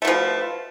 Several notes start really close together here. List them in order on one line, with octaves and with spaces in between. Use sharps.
A3 B2 F3